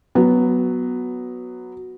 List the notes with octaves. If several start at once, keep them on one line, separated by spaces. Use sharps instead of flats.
F#3 B3